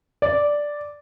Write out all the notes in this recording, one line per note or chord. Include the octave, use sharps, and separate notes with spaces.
D5